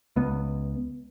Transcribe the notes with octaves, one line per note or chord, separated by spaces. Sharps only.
C#2 B3